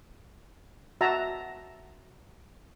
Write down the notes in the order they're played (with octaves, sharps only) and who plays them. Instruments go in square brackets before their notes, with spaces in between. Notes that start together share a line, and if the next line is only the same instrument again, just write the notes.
[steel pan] F#4 E5 A5 A#5